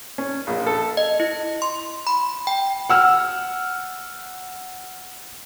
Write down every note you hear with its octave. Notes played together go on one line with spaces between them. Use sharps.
C#4
A#1
A4
D#5
E4
C6
B5
G5
F#5 E6 F6